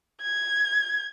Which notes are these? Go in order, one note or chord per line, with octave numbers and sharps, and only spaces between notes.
G#6